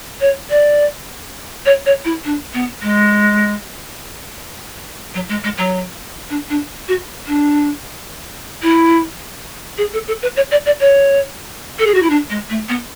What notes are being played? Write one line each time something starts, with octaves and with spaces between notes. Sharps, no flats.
C#5
D5
C#5
C#5
E4
D4
B3
G#3
F#3
G#3
G#3
F#3
D4
D4
F#4
D4
E4
G#4
A4
A4
B4
C#5
D5
D5
C#5
A4
G#4
F#4
E4
D4
G#3
A3
B3